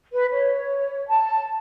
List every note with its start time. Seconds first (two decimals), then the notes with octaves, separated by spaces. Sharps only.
0.13 B4
0.32 C#5
1.08 A5